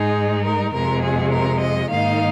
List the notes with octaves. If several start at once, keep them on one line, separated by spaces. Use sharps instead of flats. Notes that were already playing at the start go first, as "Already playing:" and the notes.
Already playing: G#2 G#3 D#4 G#4
A#4
F2 C3 G#3 A#4
G#4
A#4
D#5
G#2 D#3 A#3 D#4 F5